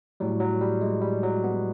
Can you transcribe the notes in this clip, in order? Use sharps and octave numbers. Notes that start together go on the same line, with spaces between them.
A2 F#3 G3
F#3
G3
G#3
G3
F#3
B3